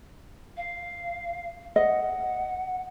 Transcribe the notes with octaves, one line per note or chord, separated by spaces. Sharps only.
F5
D#5 F#5